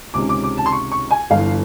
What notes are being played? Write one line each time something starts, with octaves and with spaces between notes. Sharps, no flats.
C#2 C3 D#3 G#3 C#4 D6
D6
D6
A5
C6
C#6
C#6
G#5
G1 G2 E3 F5